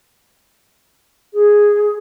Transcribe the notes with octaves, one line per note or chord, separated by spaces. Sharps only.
G#4